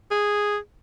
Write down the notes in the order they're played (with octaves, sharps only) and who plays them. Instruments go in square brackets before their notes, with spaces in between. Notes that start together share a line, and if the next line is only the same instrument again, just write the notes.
[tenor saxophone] G#4